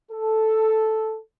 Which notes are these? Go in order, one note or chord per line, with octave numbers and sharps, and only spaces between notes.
A4